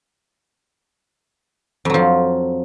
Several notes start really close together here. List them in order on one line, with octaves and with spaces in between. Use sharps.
F2 F#3 F3